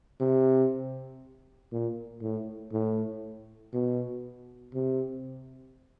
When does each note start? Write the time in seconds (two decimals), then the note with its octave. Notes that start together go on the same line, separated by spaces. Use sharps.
0.20 C3
1.72 A#2
2.22 A2
2.73 A2
3.74 B2
4.74 C3